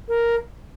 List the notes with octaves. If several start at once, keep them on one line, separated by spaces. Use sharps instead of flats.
A#4